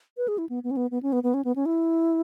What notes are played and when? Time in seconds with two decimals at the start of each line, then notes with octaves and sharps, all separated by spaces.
0.17 B4
0.28 G#4
0.38 E4
0.49 B3
0.64 B3
0.71 C#4
0.77 B3
0.91 B3
1.03 C#4
1.13 B3
1.23 B3
1.34 C#4
1.45 B3
1.56 C#4
1.66 E4